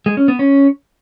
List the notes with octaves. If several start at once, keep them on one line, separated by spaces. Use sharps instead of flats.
G#3
C#4
B3
C#4